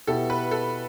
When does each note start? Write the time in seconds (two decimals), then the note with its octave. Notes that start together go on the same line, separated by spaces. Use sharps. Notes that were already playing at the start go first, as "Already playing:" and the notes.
0.07 B2 B3 E4 G4 A4
0.30 B4
0.51 A4